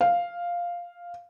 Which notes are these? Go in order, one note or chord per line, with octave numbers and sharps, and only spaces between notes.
F5